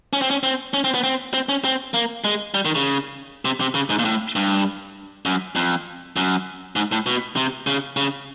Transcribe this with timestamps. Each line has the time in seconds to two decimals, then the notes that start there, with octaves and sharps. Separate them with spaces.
0.13 C#4
0.22 C4
0.30 C#4
0.43 C4
0.74 C#4
0.84 C4
0.94 B3
1.03 C4
1.34 C4
1.49 C#4
1.65 C4
1.94 A#3
2.24 G#3
2.54 G3
2.65 D#3
2.75 C#3
3.45 C3
3.61 C3
3.75 C#3
3.90 G#2
3.99 A#2
4.05 A2
4.36 G2
5.25 F#2
5.55 F2
6.16 F#2
6.76 G#2
6.92 A2
7.06 B2
7.36 C3
7.67 C#3
7.97 C#3